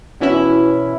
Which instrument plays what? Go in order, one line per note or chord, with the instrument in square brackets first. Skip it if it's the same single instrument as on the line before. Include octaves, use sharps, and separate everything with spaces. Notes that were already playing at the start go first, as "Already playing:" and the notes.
[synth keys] B2 E3 C#4 E4